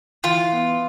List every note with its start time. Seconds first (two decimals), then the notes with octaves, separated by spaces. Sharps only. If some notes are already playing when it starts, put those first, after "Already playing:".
0.24 E3 F4
0.52 B3